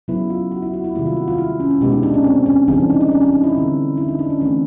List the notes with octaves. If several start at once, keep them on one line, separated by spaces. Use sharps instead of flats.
C#3 F#3 B3 E4
F4
F#4
E4
F#4
E4
C3 D#3 G3 A#3 E4
F4
F#4
F4
E4
C#4
C#4
B2 G#3 B3 G4
D#4
D4
C#4
C4
C#4
C#3 E3 G3 C4 D4
D#4
D4
C#4
C#4
D#4
E4
D3 G3 C4
E4
D#4
D4
C#4
E3 A3 C4 C#4